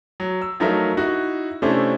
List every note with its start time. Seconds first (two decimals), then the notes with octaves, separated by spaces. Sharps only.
0.20 F#3
0.41 E6
0.60 F3 F#3 A3 D#4 A#4 E5
0.97 D#4 E4 F#4
1.62 C3 A3 C#4 D4 E4 C5